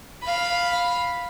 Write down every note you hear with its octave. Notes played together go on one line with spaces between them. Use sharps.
F5 B5